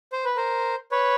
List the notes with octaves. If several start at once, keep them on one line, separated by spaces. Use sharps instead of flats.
C5
B4
A#4 C5
B4 C#5